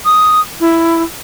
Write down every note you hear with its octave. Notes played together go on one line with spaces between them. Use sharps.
D#6
E4